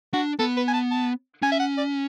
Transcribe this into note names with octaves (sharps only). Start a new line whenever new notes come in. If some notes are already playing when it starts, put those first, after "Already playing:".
D4 F#4
B3 A4
B4
G#5
A5
A5
C#4 G#5
E5
F#5
D5